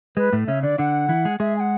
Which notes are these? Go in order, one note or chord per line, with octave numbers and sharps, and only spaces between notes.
G#3 B4
A2 A3
C#3 C#4 E5
D3 D4 D5
D3 D4 F#5
E3 E4
G#3 G#4
G#3 G#4 E5
G#5
F#5